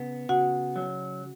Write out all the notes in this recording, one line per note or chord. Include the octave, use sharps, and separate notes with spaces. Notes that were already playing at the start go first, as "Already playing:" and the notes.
Already playing: C#3 B3
C#3 F#4 F#5
F#3